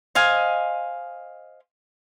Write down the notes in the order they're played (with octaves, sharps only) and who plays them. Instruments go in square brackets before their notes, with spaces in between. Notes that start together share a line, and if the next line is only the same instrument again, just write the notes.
[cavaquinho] C5 D#5 F5 G#5